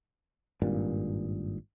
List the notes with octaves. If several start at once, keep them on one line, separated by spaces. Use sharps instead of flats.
G#1 G2 A#2